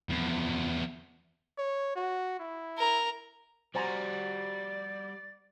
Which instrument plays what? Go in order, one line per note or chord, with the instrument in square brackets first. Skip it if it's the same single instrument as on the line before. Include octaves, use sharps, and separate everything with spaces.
[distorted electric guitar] E2 F3
[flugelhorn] C#5
F#4
E4
[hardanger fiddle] A#4
[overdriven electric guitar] G3 F#4 [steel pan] C5 G#5 A#5 [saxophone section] D5 [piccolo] A6